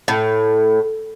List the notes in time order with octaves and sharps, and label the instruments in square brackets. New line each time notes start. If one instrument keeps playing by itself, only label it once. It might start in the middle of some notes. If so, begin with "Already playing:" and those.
[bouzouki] A2